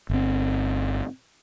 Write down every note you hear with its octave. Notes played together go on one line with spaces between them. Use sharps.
G1 C4